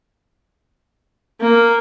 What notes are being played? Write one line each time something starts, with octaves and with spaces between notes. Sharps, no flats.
A#3